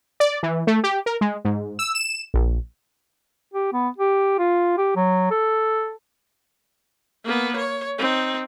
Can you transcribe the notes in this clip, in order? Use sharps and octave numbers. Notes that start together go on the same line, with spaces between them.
D5
E3
A3
G4
A#4
G#3
G#2
E6
E7
A#1
G4
B3
G4
F4
G4
F#3
A4
A#3 B3
C#5
C4 D#4